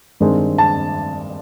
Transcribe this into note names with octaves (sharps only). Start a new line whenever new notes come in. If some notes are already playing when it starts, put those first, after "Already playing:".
G2 D#3 G#3 C4
A5